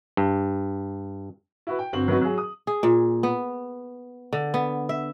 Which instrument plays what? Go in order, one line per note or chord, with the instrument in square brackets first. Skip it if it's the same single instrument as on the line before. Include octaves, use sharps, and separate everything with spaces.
[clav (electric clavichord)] G2
[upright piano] E4 F#4 B4
G5
G1 C4 F#4 F#7
F#3 B3 C4 D#4 F#4 B4
F#3 G#4
D#6
[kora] G#4
A#2
B3
D3
B3
E5